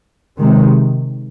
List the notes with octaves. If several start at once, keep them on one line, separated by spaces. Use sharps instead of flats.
C3 D#3 G#3